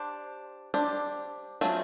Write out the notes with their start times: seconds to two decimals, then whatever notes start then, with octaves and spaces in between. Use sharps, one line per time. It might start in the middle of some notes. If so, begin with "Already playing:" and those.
Already playing: D4 G4 C5
0.74 D4 G4 C5
1.61 F#3 A3 C4 F4 G#4